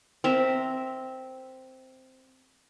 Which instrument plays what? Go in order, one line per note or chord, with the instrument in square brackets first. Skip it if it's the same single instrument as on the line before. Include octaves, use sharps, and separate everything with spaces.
[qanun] C4 A#4 E5